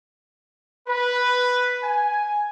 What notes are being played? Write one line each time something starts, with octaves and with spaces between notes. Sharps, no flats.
B4
G#5